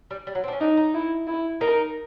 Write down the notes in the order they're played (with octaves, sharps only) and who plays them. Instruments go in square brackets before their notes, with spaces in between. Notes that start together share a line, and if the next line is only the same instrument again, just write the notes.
[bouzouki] G3
G3
F#3
C4
D4
C#4
[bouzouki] D4 [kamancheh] D#4
[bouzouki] D#4
[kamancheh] E4
E4
[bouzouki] D#4 [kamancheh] A#4